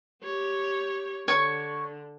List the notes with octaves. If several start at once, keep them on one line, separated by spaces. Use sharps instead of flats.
G4 C#5
D3 C#5 C#6